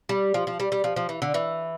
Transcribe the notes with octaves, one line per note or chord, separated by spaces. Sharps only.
G3
F3
F3
G3
G3
F3
F3
E3
D3
E3